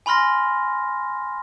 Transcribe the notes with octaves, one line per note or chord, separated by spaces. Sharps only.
G#5 B5 C6 F6 A#6